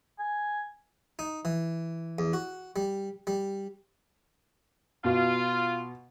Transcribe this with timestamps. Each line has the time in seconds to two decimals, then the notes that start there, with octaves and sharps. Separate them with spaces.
0.19 G#5
1.19 D#4
1.45 E3
2.19 E2
2.33 F#4
2.76 G3
3.27 G3
5.04 B2 F4